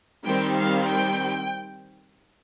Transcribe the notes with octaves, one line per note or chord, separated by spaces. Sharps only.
D#3 G3 C4 G5
F5
G5